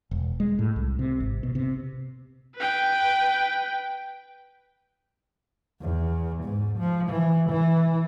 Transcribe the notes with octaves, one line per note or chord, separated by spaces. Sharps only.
E1
G#3
A2
C2
C3
G#1
B2
C3
B4 G5
E2
G#2
F3
E3
E3